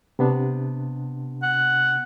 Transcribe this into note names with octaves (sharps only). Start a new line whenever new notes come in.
C3 B3 D4
F#5